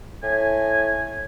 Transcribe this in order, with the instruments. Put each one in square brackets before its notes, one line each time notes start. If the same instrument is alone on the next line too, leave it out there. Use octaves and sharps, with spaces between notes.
[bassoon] A2 [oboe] G#5